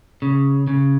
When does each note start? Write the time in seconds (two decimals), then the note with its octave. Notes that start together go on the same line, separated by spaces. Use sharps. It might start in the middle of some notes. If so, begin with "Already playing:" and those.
0.22 C#3
0.67 C#3